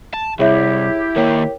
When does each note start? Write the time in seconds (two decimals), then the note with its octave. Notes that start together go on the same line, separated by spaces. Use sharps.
0.14 A5
0.39 C2 E4 G4 G#4 C#5 E5
1.16 D#3 A#3 A#4 C#5 G5